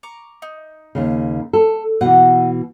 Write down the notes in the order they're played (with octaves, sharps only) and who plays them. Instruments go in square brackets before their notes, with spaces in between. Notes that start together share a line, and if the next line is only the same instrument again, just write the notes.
[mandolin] A#5 C#6 D6
D#4
[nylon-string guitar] D#2 C#3
A4
[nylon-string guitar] B2 E3 [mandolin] A3 F#4 F#5